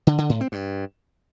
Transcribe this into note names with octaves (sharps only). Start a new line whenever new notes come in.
D3
D3
A2
C4
G2